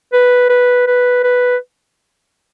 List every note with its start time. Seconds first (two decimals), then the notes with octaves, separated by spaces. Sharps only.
0.13 B4
0.49 B4
0.87 B4
1.23 B4